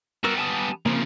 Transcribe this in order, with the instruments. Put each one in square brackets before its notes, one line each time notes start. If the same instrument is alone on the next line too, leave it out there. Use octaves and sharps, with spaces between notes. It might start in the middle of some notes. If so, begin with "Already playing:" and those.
[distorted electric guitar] G3 B3 [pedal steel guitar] F#4 A#4 E6
[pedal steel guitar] G#5 A5 D#6
[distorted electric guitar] C#3 F3 [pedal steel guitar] A#3 C4